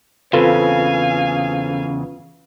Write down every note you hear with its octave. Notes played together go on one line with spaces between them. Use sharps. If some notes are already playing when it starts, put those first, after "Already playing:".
E2 C#3 C4 F4 A4 B4 F5 G#5